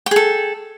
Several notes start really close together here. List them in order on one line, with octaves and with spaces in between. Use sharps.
G5 G#4 A4